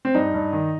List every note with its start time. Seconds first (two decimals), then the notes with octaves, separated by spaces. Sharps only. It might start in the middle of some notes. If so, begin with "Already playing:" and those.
0.05 C4
0.15 G2 D#4
0.34 G2
0.53 D#3